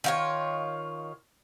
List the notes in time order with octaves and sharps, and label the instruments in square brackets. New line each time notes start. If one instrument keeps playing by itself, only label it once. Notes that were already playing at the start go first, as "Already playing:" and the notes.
[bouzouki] D#3 F4 C#5